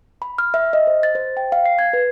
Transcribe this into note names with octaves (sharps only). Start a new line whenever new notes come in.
B5
F6
E5
D#5
C5
A6
C5
G5
F5
C7
G#6
B4